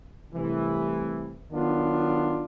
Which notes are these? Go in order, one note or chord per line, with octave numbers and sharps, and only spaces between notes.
C2 C3 E3 A3
D#3 F#3 B3 D4 F4